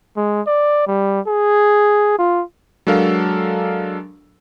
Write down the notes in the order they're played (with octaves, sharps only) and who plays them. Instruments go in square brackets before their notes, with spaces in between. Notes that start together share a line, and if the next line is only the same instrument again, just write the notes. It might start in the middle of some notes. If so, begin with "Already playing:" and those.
[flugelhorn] G#3
D5
G3
G#4
F4
[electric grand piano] F#3 G#3 D4 A4 A#4 F5